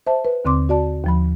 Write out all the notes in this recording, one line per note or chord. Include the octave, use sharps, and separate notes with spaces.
C5 E5 A5
B4
D#2 D3 C4 C6 D6
F#4 D5 A5
D#2 F3 B5